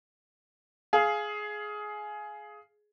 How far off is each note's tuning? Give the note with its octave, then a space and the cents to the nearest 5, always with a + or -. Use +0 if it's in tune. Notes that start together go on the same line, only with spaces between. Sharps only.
G#4 +15 F5 -10